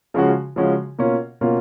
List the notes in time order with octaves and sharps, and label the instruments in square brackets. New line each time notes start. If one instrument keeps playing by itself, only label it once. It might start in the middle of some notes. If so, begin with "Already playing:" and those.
[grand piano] C#3 F3 G#3 C#4 F#4
C#3 F3 G#3 C#4 F#4
B2 A#3 C#4 F4
B2 A#3 C#4 F4